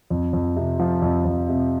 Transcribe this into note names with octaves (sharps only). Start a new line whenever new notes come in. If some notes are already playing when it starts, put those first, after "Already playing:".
F2
F2
C3
F3
F2
F2
C3